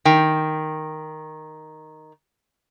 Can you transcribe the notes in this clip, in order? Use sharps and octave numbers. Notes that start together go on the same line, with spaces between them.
D#3 G5